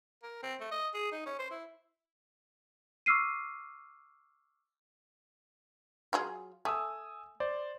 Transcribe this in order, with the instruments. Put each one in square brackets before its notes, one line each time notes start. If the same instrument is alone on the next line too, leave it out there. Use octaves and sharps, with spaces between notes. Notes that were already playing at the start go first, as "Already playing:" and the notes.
[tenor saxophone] A#4
C4
A3
D#5
G#4
D#4
C#4
C5
E4
[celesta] C#6 D6 E6 F6 C7 D#7
[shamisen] F#3 F4 G#4
[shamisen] A3 [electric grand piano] G#5 D#6 E6
[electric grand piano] C5 D5